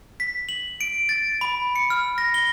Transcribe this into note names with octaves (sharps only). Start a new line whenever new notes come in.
B6
F#7
D7
A6
B5
C#7
F6
A#6
G7